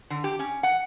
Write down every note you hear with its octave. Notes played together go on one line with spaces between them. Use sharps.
D3
G4
C#4
F#5